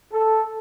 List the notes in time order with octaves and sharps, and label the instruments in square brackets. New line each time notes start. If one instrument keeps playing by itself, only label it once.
[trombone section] A4